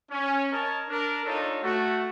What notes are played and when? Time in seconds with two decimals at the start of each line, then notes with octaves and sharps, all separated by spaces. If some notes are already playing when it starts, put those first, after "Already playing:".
0.11 C#4
0.52 A#4 C#5 D#5 A5
0.89 D4 A#4
1.25 D4 D#4 F4 A4 C#5
1.62 A3 F#4